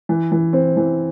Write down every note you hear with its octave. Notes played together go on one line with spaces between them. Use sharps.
E3
E3
C4
E3